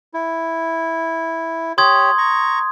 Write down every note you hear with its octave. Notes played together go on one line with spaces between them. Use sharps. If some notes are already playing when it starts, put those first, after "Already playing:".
E4
G4 C#5 C6 D#6 G#6
A#5 C#6